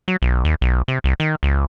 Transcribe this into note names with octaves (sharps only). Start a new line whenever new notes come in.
F#3
B1
D#2
B1
C3
C2
D#3
C#2